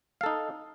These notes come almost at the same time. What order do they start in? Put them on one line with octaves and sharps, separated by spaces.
F5 A4 D#4